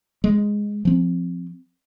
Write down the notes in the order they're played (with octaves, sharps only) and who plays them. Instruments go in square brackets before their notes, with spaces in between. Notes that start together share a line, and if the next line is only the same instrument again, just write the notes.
[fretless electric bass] G#3
F3 C4